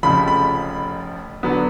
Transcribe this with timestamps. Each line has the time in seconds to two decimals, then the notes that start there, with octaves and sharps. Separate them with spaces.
0.03 F1 F2 C#3 F3 B5
0.28 B5
1.43 D3 F#3 B3